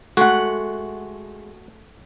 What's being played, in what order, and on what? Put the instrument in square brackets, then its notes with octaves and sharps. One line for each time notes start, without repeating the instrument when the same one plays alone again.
[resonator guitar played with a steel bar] G#3 F#5 [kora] A3 [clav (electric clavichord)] F#4